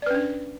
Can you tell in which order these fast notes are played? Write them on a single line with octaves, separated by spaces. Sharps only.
D5 B4 C#4 D4